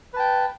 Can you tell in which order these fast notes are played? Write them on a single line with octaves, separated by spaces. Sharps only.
B4 A5 G5